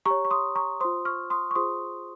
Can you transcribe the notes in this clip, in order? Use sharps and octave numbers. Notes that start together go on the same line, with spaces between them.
G4 C#5 A#5 C#6
C#6
C6 D#6
A#5 C#6
F4 C5 C6 D#6
C#6 F6
C6 D#6
C#6
F4 G#4 C5 C6 D#6